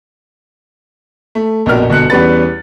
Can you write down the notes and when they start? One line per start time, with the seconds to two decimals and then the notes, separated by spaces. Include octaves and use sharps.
1.35 A3
1.66 A#1 F2 B2 A#4 F6
1.90 G1 B2 F#6 C#7
2.10 E2 G3 C#4 B4 A6